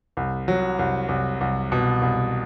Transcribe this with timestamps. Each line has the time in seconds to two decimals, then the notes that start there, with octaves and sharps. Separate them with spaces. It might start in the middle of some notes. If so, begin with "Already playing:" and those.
0.17 C2
0.48 F#3
0.79 C2
1.09 C2
1.41 C2
1.72 B2
2.02 C2